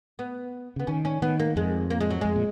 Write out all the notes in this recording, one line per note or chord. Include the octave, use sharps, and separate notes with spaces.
B3
C#3 B3
D#3 C#4
C#4
D#3 B3
A#3
F2 G#3
A#3
G#3
F#3
F2 G#3
A#2